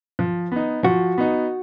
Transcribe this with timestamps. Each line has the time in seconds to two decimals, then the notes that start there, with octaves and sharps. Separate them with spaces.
0.19 F3
0.52 B3 D#4
0.84 F3 F#4
1.18 B3 D#4